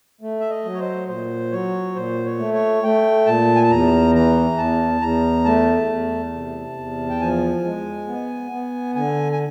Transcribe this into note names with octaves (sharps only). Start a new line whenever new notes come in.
A3
E5
D#5
F#3
C#5
C5
A#2 C5
F#3 C#5
A#2 C5
C#5
A3
C#5
A3 G5
A#2 A5
G#5
A5
E2 A#5
E3 A#5
E2 A5
E2 A#5
A3 A5
E2
C3
E2
G5
F3 G#5
G#3
B3
B3
D3 G#5
G#5